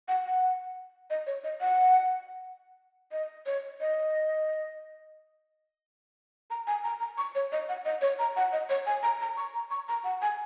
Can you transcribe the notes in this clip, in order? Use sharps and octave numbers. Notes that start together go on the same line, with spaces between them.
F#5
F#5
D#5
C#5
D#5
F#5
D#5
C#5
D#5
A#5
G#5
A#5
A#5
C#6
C#5
D#5
F#5
D#5
C#5
A#5
F#5
D#5
C#5
G#5
A#5
A#5
C#6
A#5
C#6
A#5
F#5
G#5